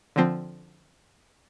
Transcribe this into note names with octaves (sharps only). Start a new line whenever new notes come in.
D3 F3 C4